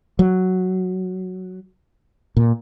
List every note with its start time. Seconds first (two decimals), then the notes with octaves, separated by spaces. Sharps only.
0.19 F#3
2.37 A#2